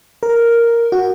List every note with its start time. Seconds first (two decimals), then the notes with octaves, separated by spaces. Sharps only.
0.23 A#4
0.92 F#4